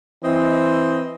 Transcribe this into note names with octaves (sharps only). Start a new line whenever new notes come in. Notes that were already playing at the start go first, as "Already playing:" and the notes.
E3 C4 D#5